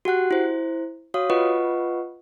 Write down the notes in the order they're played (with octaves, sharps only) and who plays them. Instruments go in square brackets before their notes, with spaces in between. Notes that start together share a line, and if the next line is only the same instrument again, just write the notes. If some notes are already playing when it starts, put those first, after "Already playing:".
[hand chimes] F#4 G4 F#5 F#6
E4 C5
F#4 C#5 F5 D#6
F4 B4 D#5 F#5 C#6